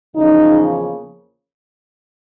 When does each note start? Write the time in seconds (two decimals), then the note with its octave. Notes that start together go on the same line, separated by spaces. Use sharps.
0.15 E2 C#3 F3 A#3 C#4 D#4